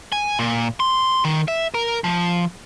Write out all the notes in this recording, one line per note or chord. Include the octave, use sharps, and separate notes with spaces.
G#5
A#2
C6
D#3
E5
A#4
F3